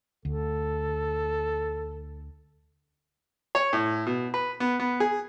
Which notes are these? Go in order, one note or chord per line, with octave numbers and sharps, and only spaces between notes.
D2 A4
C#5
A2
B2
B4
B3
B3
G#4